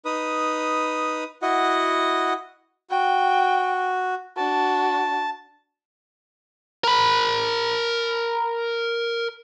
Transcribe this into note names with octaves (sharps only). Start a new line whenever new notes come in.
D#4 B4 D#6
E4 F#4 D#5 F#5
F#4 G5
D4 F#4 A5
A#4 B5